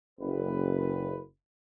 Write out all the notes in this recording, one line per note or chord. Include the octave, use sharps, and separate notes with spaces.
F#1 B4